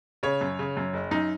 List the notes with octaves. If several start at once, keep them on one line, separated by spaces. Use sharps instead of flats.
C#3 C#5
F#2
C#3
F#2
F#1
F#2 D#4